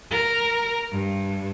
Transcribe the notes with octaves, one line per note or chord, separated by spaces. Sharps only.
A#4
G2